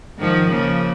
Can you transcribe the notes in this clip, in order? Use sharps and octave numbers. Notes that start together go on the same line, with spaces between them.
G#2 D#3 F3
C#3 F3 A#3